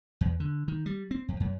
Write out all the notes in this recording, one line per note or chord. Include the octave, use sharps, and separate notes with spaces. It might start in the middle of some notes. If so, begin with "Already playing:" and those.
E2
D3
D#3
G3
C4
F2
F#2